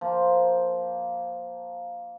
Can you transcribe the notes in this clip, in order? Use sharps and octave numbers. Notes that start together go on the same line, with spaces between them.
F3 A#3